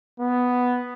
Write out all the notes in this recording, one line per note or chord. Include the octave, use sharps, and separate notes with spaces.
B3